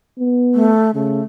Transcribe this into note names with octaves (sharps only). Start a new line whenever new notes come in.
B3
A3
C#3 A3